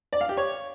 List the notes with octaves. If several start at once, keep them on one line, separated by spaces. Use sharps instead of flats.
D5
F5
G4
C#5